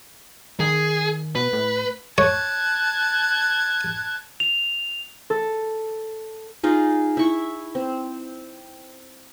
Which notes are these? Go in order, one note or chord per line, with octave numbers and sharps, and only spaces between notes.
D#3 G#4
B2 B4
A2
C#5 A5 F#6 G#6
F7
A4
D#4 F4 G#4
E4 C#6
C4